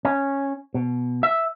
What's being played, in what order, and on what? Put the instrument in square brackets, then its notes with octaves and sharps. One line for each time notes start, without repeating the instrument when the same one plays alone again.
[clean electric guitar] C#4
B2
E5